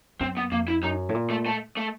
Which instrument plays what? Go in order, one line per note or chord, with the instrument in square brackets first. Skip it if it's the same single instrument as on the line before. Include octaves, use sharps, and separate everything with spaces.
[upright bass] F#2 [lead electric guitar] C4
[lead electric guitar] B3
[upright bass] F2 [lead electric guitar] A#3
[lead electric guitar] E4
[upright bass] F#2 [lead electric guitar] D#4
[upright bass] A2
A#2
[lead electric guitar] A3
A3
A3